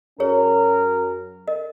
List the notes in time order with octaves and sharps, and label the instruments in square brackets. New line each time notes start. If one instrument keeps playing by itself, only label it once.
[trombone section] F#2 F#3 C#4 A#4 [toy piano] G#4 C#5
[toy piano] A#4 D#5